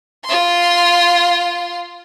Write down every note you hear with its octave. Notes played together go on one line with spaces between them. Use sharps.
F4 C6